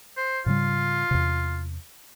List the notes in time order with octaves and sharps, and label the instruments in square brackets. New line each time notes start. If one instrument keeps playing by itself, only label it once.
[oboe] C5
[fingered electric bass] G#2 C#3 G3 [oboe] F4
[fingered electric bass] E2 C3